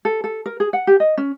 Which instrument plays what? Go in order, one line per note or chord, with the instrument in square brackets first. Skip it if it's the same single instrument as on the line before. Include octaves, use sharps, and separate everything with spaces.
[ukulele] A4
A4
A#4
G#4
F#5
G4
D#5
C#4